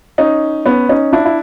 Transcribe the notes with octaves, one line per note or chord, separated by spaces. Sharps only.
C#4 D#4
B3 C#4
C#4 D#4
D4 E4
E4